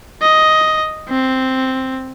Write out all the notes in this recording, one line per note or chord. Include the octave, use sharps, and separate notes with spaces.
D#5
C4